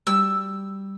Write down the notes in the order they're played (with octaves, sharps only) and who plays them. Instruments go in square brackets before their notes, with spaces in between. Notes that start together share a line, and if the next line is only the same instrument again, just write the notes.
[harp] G3 [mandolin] E6